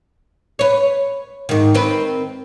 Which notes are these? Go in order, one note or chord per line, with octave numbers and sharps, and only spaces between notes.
B4 C#5
G#2 D#3
D#3 C4 B4